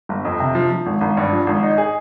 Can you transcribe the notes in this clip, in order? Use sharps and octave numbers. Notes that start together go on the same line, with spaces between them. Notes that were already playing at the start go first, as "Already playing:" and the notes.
G1
F2
C3
F3
F3
G#1
G#1
G2
F3
G#1
D#4
G#4